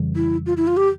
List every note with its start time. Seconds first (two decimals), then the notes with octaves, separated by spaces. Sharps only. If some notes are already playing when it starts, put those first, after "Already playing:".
Already playing: F2 C#3 E3 G3
0.16 E4
0.46 F4
0.57 E4
0.67 F4
0.77 G4